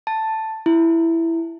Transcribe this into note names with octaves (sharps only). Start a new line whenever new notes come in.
A5
E4